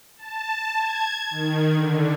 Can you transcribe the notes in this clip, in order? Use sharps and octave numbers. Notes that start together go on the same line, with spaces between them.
A5
G#6
D#3
D3